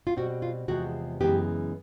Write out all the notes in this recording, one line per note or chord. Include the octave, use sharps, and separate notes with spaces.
F4
B2 G3 C4 F#4
F4
E2 C3 F3 G#3 F#4
F#2 C#3 E3 G#3 B3 G4